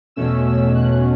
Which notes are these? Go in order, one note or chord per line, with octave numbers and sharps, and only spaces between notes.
E2 B2 A3 C#4 E6
E6
F#6